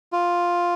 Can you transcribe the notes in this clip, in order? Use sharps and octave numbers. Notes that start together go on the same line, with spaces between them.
F4